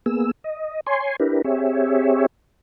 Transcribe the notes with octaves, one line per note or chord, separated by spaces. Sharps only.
A#3 B3 G#4 E6
D#5
C#5 G#5 C6
D4 E4 G4 A#4 B4
C4 G4 G#4 C#5 E5